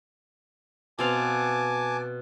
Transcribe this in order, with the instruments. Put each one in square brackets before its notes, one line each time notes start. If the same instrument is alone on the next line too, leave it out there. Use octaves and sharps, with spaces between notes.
[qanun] B2 C4 F5 [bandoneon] G#5 A5 D6